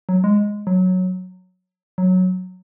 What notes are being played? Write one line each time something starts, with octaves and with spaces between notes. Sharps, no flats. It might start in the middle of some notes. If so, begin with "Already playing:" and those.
F#3
G#3
F#3
F#3